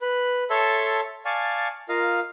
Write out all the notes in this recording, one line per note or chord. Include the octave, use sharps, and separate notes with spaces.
B4
A4 C#5 E5 A5 C6
D5 F5 G#5 A5 C#6
F4 A#4 D#5 F5